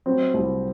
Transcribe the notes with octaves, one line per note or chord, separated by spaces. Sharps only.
F#3 C4
C2